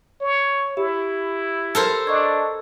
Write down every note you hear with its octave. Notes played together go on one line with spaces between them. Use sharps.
C#5
E4 G4
A4 A#4 C5
D4 D#5 C#6 G#6